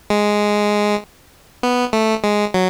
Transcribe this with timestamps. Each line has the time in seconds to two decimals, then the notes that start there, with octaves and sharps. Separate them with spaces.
0.10 G#3
1.63 B3
1.93 A3
2.24 G#3
2.54 F#3